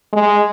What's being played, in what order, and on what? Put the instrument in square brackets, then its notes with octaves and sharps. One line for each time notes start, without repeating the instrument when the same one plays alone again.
[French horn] G#3